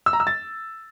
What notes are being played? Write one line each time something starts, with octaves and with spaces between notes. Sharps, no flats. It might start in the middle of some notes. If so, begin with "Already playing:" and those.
E6
A#5
E6
A6